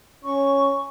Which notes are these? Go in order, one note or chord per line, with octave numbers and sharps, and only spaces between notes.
C#4 C#6